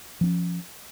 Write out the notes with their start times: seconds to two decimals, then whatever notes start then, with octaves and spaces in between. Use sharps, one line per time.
0.21 F3
0.24 C4
0.26 C#4